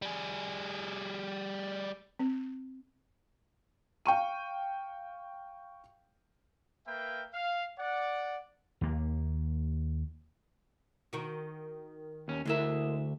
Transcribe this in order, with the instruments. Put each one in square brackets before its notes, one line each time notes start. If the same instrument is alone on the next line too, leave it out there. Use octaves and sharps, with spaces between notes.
[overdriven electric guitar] G3 G#4
[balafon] C4
[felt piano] F5 G5 C#6 D#7
[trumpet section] A#3 A#4 B4 E5 G5
F5
D5 F#5
[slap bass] D#2 A#3
[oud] D#3 F#4
[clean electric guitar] D#2 C#4
[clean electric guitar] D2 E5 [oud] G#3 E4 A#4